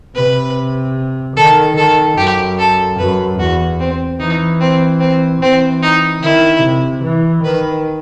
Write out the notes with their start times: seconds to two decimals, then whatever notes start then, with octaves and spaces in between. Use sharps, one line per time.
0.15 C3 B4
1.36 D#3 A4
1.77 D#3 A4
2.17 F#2 G4
2.59 A4
2.98 F#2 B4
3.39 E2 F#4
3.80 C4
4.20 E3 D#4
4.60 C4
5.00 C4
5.41 E3 C4
5.82 D#4
6.22 D#3 E4
6.62 C3
7.03 E3
7.44 D#3 B4